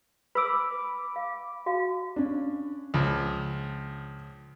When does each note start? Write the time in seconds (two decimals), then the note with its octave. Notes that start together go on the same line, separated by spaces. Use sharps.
0.35 B4 B5 D6 E6
1.16 F5
1.66 F#4 F5 A5
2.16 C#4 D4
2.94 C#2 F3